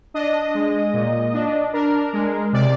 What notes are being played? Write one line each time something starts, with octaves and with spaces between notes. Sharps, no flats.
D4 D#5
G#3
A#2
D4
D4 A#4
G#3
C3 D5